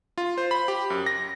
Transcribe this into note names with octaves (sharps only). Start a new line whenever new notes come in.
F4
C5
B5
G4
F#2
A#6